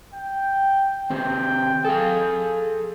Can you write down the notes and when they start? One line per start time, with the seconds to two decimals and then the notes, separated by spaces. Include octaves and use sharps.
0.14 G5
1.10 D#3 C4 G4 G5
1.85 G#4 A4 F5